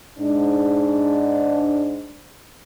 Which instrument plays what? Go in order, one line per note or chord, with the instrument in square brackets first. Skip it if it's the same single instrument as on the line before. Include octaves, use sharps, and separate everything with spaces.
[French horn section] G#2 D4